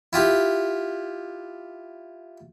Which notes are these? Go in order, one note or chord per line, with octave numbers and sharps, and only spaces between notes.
E4 F4 G4